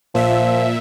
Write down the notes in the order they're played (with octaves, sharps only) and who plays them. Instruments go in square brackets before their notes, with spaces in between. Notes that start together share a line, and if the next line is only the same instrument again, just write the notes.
[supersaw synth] A#2 E5 [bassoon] F3